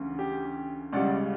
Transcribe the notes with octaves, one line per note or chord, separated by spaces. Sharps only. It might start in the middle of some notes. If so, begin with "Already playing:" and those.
Already playing: D2 C#3 E3
G4
C#2 C#3 G3 D5 F#5